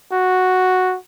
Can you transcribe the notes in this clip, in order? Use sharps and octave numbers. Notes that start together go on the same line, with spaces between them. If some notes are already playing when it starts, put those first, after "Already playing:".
F#4